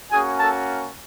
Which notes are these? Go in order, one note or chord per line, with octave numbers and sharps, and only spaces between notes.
A#3 C#4 F#4 G#4 G#5
A4 A5